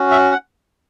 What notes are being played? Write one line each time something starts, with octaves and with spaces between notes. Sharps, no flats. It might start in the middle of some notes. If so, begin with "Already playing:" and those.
Already playing: C#4 F#4
E5
F#5